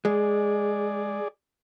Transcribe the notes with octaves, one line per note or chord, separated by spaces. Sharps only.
G#3 G#4 D5